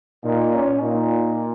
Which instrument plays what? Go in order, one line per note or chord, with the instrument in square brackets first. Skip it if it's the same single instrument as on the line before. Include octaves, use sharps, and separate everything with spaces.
[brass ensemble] A#2 [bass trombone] D#4
[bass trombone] C#4
[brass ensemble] A#2 [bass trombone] D#4